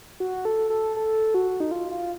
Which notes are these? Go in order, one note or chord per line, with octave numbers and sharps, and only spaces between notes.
F#4
A4
A4
A4
F#4
D#4
F4
F4